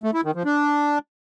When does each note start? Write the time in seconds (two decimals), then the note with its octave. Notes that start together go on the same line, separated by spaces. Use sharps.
0.04 A3
0.14 E4
0.24 D#3
0.35 F3
0.45 D4